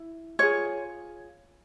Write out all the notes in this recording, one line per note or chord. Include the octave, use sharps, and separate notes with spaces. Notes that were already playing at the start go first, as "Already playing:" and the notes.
Already playing: E4
F4 G#4 C#5